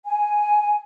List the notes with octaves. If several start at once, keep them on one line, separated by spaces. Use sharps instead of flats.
G#5